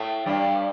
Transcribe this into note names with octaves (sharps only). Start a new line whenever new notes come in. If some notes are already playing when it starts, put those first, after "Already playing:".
Already playing: A2 A3
G2 G3